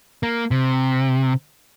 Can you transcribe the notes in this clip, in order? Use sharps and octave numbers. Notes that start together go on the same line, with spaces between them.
A#3
C3